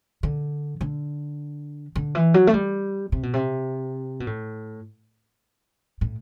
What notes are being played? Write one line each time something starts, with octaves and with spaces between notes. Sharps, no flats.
D3
D3
D3
E3
F#3
A3
G3
C3
B2
C3
B2
A2
A2